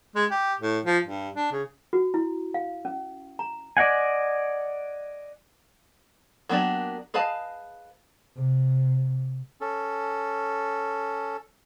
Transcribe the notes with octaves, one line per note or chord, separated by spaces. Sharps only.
G#3
G4
A2
F3
G2
D4
C#3
F#4
E4
F5
C#4
A#5
D5 D#5 F#5 G#5
F#3 A#3 B3 D4 G4
G#4 B4 D#5 F5 A5
C3
C#4 A4